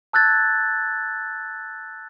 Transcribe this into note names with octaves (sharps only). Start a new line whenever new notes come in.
A5 E6 F#6 G#6 A6